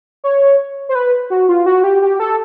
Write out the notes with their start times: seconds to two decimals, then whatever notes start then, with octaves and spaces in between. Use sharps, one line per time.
0.24 C#5
0.89 C5
0.95 B4
1.30 F#4
1.49 F4
1.66 F#4
1.84 G4
2.02 G4
2.20 A4